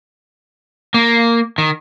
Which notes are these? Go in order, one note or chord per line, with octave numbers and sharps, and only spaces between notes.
A#3
D#3